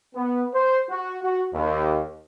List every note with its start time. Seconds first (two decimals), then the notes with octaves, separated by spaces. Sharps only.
0.15 B3
0.54 C5
0.89 F#4
1.23 F#4
1.54 D#2